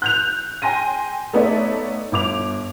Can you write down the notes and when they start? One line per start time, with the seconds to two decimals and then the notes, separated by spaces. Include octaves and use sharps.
0.02 F#6 G6 F7
0.62 G5 G#5 C6 A#6 D#7
1.33 A3 B3 D#4 C#5 D5 E5
2.12 G1 D6 F7